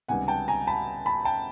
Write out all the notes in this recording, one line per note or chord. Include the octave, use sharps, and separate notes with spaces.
C#2 C3 D#3 G3 B3 F#5 G#5
G5 A5
G#5 A#5
A5 B5
A5 B5
G5 A5